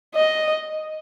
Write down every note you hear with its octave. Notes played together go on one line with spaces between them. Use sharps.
D#5